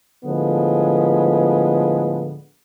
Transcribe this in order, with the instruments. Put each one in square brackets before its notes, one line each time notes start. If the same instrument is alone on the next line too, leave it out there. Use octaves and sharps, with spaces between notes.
[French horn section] A2 D3 F3 G#3 B3